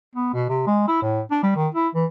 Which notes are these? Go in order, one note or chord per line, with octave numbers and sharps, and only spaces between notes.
B3
B2
C3
G#3
E4
A2
D4
G3
D#3
E4
E3